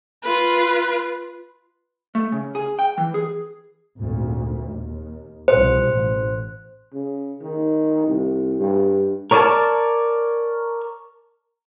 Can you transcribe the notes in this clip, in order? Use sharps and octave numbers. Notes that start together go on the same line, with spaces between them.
F4 B4
A3
C#3
G#4
G5
E3
G#4
G#1 D2 A#2
D#2
C2 B2 F3 C5
A1
C#3
D#3
C2
G2
A#4 C#5 D5 G#5 A5